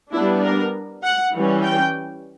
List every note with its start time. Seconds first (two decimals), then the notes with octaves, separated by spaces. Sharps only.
0.12 G3 B3 D4 E4
0.42 A#4
1.03 F#5
1.33 E3 G3 C#4
1.63 G5